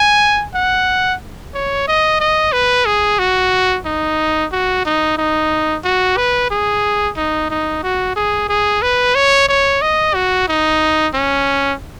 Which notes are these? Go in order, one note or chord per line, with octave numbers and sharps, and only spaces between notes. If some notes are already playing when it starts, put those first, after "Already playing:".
Already playing: G#5
F#5
C#5
D#5
D#5
B4
G#4
F#4
D#4
F#4
D#4
D#4
F#4
B4
G#4
D#4
D#4
F#4
G#4
G#4
B4
C#5
C#5
D#5
F#4
D#4
C#4